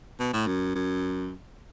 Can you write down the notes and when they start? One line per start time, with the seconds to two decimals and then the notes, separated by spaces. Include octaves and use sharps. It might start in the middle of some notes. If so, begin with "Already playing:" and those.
0.20 B2
0.33 A2
0.47 F#2
0.75 F#2